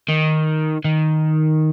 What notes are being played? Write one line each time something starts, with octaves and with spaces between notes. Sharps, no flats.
D#3
D#3